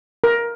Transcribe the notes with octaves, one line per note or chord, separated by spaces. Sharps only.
A#4